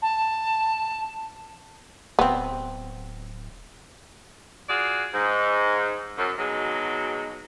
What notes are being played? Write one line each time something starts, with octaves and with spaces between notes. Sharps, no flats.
A5
D1 B3 C4
F4 F#4 G#4 D5
G#2
F#2
G#2 B2 F#3 G#3